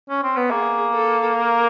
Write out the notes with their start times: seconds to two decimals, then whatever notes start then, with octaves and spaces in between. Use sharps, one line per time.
0.09 C#4
0.24 C4
0.37 B3
0.50 A#3 G#4
0.94 A4
1.36 A#4